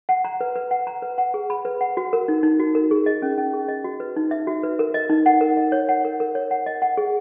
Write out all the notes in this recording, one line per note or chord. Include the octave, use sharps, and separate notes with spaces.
F#5
A#5
B4
B4
F#5
A#5
B4
F#5
G#4
B5
B4
F#5
F#4
A#4
D#4
D#4
F#4
A#4
G#4
D#5
C#4
C#4
G#4
D#5
F#4
B4
D#4
E5
F#4
B4
A#4
D#5
D#4
F#5
A#4
D#5
C#5
F#5
A#4
A#4
C#5
F#5
D#5
F#5
G#4